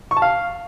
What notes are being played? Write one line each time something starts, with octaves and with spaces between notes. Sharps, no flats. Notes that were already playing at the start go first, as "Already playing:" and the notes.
C#6
A5
F5